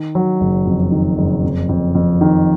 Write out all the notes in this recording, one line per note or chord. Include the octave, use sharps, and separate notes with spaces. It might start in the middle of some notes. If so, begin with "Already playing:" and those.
Already playing: D#3
F#3
F#1
F2
D#3
F#1
F2
F2
F2
D#3